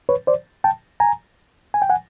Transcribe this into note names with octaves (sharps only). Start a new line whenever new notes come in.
B4 C#5
C5 D5
G5 A5
G#5 A#5
G#5
G5
F#5 G#5